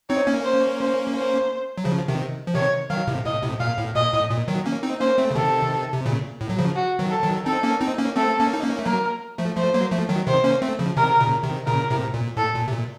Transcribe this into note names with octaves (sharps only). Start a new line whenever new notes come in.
C4 D#4 C#5
A#3 C#4
C5
C5
C5
F#3
C#3 F3
C3 D#3
F3
C3 D#3 C#5
D#3 F#3 F5
A2 C3
A2 D#5
A2 C3
A#2 F5
A2
A#2 D#5
A2
A#2
D#3 F#3
A#3 C#4
C4 D#4
A#3 C#4 C5
A3 C4
C#3
C3 D#3 A4
C3
A#2 C#3
A2
F#3
C#3 F3
F#4
D#3 F#3
A4
D#3 F#3
C4 D#4 A4
A#3 C#4
C4 D#4
A#3 C#4
A3 C4 A4
A#3 C#4
D#4
A#3 C#4
A3
F#3 A#3 A#4
F3 A3
F3 A3 C5
F#3 A#3
F3 A3
D#3 F#3
C3 D#3 C5
A#3 C#4
A3 C4
C#3 F3
C3 D#3 A#4
A#2 C#3
C3 D#3
A#2 C#3 A#4
A2 C3
A#2
A2 A4
A#2
C3
A#2